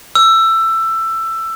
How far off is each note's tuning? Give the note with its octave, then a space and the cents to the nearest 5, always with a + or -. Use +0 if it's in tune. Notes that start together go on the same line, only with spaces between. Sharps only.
E6 +15